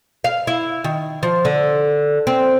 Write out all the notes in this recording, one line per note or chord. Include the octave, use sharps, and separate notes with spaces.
F5
E4
D#3
F3
D3
C4